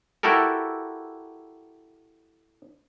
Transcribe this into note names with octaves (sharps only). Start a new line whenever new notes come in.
E4 F#4 G4 A4 A#4